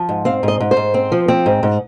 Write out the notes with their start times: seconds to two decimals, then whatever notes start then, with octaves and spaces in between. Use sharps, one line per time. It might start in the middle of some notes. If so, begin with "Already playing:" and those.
Already playing: F3
0.09 G#2
0.25 C4 F5
0.43 G#2 D#5
0.60 G#2
0.71 C5
0.77 G#2
0.94 C4
1.12 F3
1.28 C4
1.46 G#2
1.63 G#2